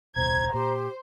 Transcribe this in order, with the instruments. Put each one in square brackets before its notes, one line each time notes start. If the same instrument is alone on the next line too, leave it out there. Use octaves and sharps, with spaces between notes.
[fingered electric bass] D#1 C2 B2 [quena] C5 [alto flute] A#5 [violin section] G#6
[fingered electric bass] A#2 [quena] G4 [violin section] C5